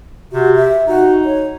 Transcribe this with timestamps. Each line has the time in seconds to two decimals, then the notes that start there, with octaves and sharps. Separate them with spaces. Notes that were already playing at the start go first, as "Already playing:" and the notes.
0.32 C3 F#4
0.55 E5
0.87 D#4 F#4
1.25 C#5